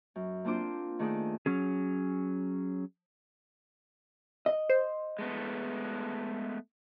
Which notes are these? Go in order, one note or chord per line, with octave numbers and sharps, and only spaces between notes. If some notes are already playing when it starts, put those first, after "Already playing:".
F#2
A#3 C4 D4 F4 C5 D6
D#3 A3 D4 G#4 D5 D#5
F#3 C#4 G#4
D#5
C5
G#3 A3 B3